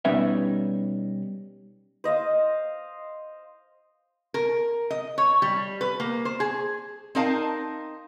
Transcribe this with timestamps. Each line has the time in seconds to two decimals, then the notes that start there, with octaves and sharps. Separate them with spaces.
0.05 B2 G3 C#4 D#4 B4 E5
2.04 C5 D#5 F5
4.34 A#4
4.91 D#5
5.18 C#5
5.42 G3
5.81 B4
6.00 A#3
6.25 C5
6.40 G#4
7.15 C4 D#4 A#4 D#5 F5 A5